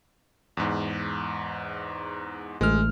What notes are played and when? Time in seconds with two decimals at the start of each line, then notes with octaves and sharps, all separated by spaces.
0.57 E2 G#2
2.61 A1 G#3 A3 F6